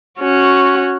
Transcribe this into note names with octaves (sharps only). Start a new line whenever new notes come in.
C#4 F#4